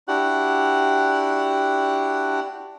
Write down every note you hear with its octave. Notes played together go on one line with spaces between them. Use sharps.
D4 E4 F#4 G4 F#5 F#6